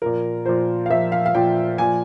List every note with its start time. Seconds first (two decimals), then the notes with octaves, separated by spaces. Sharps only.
0.02 A#2 F3 A#4
0.46 A#2 F3 C5
0.86 F5
0.90 A#2 F3 E5
1.12 F5
1.26 F5
1.34 A#2 F3 G5
1.78 A#2 F3 G#5